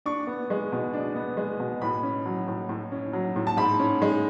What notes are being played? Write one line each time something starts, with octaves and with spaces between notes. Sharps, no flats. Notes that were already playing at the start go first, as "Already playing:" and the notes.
D4 C#6
B3
G#3
B2
D4
B3
G#3
B2
A2 B5
C#4
F#3
A2
A2
C#4
F#3
A2
A5
G#2 B5
C#4
G#3